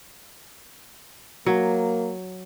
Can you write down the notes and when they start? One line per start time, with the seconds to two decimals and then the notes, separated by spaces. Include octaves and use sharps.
1.46 F#3 A#3